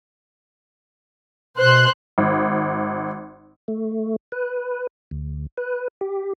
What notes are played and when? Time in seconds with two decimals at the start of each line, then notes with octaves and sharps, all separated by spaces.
1.57 B2 C5 C6 F#6
2.18 G#1
3.68 A3
4.32 B4
5.11 D2
5.58 B4
6.01 G4